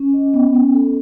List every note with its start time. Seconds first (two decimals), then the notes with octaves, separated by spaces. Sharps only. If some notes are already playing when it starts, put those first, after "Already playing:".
Already playing: C#4
0.14 D#5
0.34 B3
0.55 C#4
0.75 A4